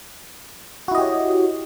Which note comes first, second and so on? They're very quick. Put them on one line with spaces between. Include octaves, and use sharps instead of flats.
F#4 E4 D#5 G4 C#5